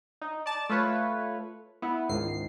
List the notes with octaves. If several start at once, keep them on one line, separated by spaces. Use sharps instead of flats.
D#4
D5 A5
A3 F4 B4 C#5
B3 E4
C#2 G#2 D#3 C7